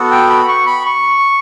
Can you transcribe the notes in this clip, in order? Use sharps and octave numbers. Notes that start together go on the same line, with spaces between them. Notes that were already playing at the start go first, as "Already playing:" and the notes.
Already playing: B3 F#4 A4
G5
B5
C#6
B5
C#6